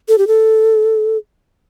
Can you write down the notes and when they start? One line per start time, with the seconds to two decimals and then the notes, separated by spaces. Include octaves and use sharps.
0.08 A4
0.18 G4
0.27 A4